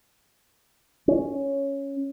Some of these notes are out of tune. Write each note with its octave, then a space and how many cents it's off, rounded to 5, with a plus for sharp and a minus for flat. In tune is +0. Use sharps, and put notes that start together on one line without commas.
C#4 +0